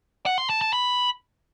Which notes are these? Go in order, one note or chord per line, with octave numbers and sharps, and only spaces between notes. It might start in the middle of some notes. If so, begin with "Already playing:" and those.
F#5
C6
A5
A5
B5